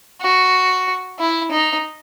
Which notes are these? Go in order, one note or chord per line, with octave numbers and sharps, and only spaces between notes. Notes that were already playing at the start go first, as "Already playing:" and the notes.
F#4
E4
D#4